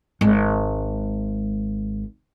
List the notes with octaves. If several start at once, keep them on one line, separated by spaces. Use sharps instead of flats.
G#1 G#3